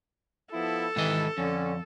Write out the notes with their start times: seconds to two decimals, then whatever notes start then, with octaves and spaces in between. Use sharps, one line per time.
0.53 F3 B3 E4 A4
0.96 G#2 C3 D#3 E3 D#5
1.38 F2 D3 C#4